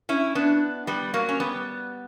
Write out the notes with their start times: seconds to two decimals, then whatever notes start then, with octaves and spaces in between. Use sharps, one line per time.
0.09 C#4 E4
0.35 B3 D4
0.87 G3 B3
1.14 F#3 A#3
1.29 C#4
1.40 G3 B3